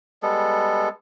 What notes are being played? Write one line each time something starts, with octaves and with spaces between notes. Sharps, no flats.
G3 G#3 B3 A4